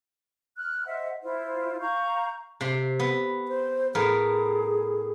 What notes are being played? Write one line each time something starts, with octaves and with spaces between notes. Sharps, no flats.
F6 F#6
C5 D#5 E5 F#5
E4 F4 C5
F5 A#5 C#6 G6
C3 C6
B3
C5
A2 B3 G#4 A#4